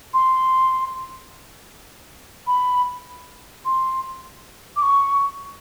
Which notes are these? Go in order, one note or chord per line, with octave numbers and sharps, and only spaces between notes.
C6
B5
C6
D6
C#6